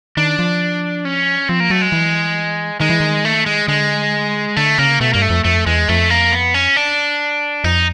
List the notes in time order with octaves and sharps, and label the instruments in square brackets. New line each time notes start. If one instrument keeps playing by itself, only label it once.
[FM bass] D#3 [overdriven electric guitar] D4
[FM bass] F3
[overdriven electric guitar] C#4
[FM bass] F3 [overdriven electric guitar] C4
[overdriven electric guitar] A#3
[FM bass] F#3 [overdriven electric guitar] A3
[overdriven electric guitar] G#3
[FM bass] E3
[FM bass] D#3 [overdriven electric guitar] G#3
[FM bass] E3
D#3
[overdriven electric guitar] A3
G#3
[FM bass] D3 [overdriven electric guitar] G#3
[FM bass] D3 [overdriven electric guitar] A3
[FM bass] C#3 [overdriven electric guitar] A#3
[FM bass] B2 [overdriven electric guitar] A3
[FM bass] G2 [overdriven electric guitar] A#3
[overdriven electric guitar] A3
[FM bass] F2
[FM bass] F2 [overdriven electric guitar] A3
[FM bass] E2 [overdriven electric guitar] G#3
[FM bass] F2 [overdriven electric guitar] A3
[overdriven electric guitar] A#3
B3
C#4
D4
[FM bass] F2 [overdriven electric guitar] D#4